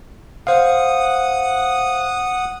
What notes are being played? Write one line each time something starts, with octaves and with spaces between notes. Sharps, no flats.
C5 F5 F#5 D#6